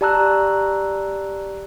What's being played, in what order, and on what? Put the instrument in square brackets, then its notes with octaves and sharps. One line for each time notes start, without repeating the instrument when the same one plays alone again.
[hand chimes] G4 D5 A5 A#5 E6 F#6